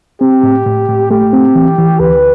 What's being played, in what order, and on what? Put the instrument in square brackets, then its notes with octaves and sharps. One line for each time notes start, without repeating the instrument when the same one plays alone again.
[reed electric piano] C4 [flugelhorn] G4
[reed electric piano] A2
A2
A2
[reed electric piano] A3 [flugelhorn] G4
[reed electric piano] C4
E3
E3
[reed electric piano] D2 [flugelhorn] B4